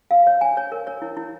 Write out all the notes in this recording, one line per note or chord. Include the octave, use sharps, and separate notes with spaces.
F5
C#5
G#5
C#5
A#4
C#5
E4
E4